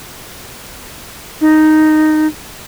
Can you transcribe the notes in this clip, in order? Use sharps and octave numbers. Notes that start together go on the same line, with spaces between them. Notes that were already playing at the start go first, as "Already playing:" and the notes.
D#4